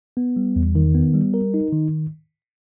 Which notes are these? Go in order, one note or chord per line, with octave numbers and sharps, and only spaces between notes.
B3
G3
E2
D#3
B3
G3
A#4
D#4
D#3